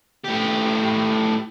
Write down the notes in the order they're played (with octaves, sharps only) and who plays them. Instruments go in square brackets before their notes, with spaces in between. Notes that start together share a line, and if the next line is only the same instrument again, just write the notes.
[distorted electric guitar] A2 G4